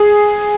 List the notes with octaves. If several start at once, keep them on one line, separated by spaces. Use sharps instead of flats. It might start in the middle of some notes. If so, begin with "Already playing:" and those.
Already playing: G#4